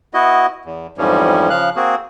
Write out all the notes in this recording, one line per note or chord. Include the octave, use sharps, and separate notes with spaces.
B3 E4 F#4 D#5
E2
F2 G#2 E3 F3 G3 C#4
C#3 F3 F5 F#6
A#3 C4 F#4 G#4